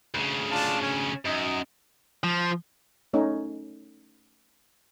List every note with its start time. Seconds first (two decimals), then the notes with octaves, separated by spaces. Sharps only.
0.15 D2 C#3
0.51 D4 F4 A5
0.81 C#4
1.25 F#2 D#4 D#5
2.24 F3
3.13 A3 C#4 D#4